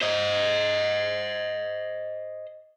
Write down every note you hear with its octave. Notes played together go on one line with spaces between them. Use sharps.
C5 D#5